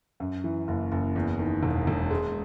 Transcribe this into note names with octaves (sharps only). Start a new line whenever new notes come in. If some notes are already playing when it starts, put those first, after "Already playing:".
F#2
E3
F#1
F#1
E2
D#3
E1
E1
G#3